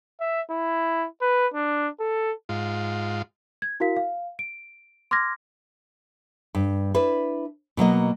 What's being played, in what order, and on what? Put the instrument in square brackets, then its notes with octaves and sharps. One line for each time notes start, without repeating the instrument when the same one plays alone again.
[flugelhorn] E5
E4
B4
D4
A4
[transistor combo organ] G#2 F4
[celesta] G#6
E4 F#4 A#4 F5 B6
F5
D7
C6 D6 F6 G#6 A#6
[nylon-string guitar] G2
D4 E4 B4
B2 F#3 A#3 D#5